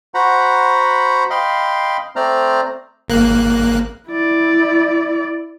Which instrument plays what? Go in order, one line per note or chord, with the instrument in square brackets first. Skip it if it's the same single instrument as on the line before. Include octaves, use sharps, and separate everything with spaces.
[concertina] F#4 C5 F#5 A#5 B5
D#5 F5 G5 B5 C6
A3 C4 C5 D5 A#5 F6
[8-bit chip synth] G#1 A#3 F#6
[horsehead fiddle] E4 D5